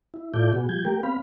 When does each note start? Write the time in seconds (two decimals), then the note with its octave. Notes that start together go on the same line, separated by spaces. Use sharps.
0.14 E4
0.34 A2 E4 F4 A4 D5 G6
0.53 B2 B3 F#4 G#4
0.69 F3 G3 G6 G#6
0.85 A3 G4 A#4 G5
1.03 B3 C4 F5 B5